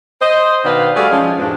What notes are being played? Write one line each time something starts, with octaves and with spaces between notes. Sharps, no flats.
C5 D#5
B2 D#3 D4 B4 F5
G3 A3 F#4 G#4 D5 F5
F3 G#3 C#4
E2 G#2 B2 F3 D4